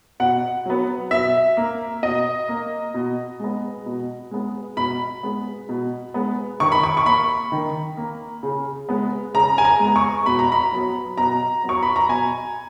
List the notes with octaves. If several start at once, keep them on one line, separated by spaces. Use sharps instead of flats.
B2 F#5
F#3 B3
B2 E5
A#3
B2 D#5
A#3
B2
G#3 B3
B2
G#3 B3
B2 B5
G#3 B3
B2
G#3 B3
D#3 C#6
B5
C#6
C#6
A#3 B5
D#3
A#3
C#3
G#3 B3
C#3 A#5
G#5
A#5
G#3 B3
C#6
B2 B5
A#5
B5
F#3 B3
B2 A#5
F#3 B3
C#6
B5
A#5
B2 G#5